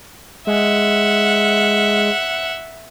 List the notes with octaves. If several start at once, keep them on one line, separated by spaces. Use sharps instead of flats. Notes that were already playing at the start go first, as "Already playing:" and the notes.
G#3 E5 F#5